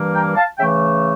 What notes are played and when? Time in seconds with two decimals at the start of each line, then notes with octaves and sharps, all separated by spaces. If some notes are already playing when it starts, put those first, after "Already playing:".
Already playing: G2 E3 G3 A#3
0.15 G5 A#5
0.36 F5 A5
0.58 C#3 E3 A3 E5 G5